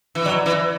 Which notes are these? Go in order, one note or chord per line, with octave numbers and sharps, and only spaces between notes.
E3
F#3 D5
E3